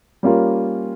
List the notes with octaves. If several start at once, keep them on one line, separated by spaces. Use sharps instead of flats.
G3 A#3 C#4 F4 A#4